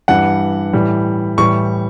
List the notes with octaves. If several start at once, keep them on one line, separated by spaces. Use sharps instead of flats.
G2 E3 G3 F#5
A2 E3 G3
A2 E3 G3 C#6